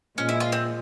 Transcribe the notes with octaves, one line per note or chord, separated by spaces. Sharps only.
A#2 F3 G#3 C#4
E4
F4
C4